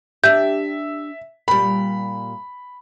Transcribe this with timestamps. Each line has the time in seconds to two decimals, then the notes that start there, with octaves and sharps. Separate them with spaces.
0.24 D4 G4 E5 G6
1.48 A#2 G3 B5